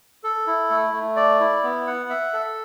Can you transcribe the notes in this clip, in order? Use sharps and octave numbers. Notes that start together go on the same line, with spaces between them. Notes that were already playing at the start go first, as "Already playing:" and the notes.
A4
E4
A3
A3
D5
E4
B3
F#5
E5
A4